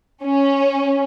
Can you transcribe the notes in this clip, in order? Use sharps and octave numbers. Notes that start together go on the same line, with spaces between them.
C#4